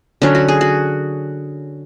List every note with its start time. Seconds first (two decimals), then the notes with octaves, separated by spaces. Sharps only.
0.22 D3 F#3 C#4 D4
0.35 F#4
0.48 G#4
0.61 F#4